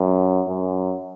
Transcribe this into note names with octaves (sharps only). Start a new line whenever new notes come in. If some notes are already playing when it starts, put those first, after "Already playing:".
Already playing: F#2
F#2